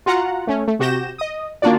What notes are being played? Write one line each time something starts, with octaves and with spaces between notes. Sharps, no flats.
F4 F#4 F#5 A#5
A3 C#4
A3
C3 F#4 G4 G6 A#6 E7
D#5 D#6
D#3 A#3 D4 F4 F#4 D5